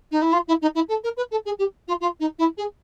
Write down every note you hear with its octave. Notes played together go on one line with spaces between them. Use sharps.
D#4
E4
F4
E4
D#4
E4
A4
A#4
B4
A4
G#4
G4
F4
F4
D#4
E4
G#4